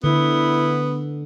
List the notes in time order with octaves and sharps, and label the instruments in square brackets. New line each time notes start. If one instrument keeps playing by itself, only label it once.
[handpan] D3 [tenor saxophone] B3 [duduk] E4